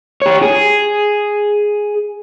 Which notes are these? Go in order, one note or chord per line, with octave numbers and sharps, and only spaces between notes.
G4 C#5
G#4